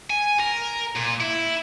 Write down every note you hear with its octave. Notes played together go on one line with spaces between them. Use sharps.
G#5
A#4
A#2
E4